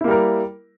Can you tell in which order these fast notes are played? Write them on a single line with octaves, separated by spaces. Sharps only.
E4 A#3 G3 A#4